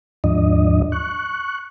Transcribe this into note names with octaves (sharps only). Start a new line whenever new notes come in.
D#2 G#2 F3 D4 D#5
C#6 F#6